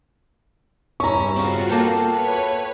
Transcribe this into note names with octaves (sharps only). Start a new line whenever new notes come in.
G2 C#4 E4 A#5 C#6
C#3 C4 F4 F#4
A#3 A4 G5
B4 C#5